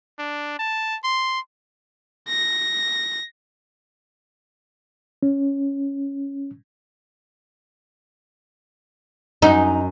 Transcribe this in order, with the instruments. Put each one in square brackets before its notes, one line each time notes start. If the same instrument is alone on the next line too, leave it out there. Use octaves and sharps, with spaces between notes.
[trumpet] D4
A5
C6
[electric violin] A#6
[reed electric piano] C#4
[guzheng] F#2 [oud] D#4